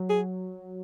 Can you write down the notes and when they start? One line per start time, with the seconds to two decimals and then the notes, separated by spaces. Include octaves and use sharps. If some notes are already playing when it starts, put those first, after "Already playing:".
Already playing: F#3
0.09 G#4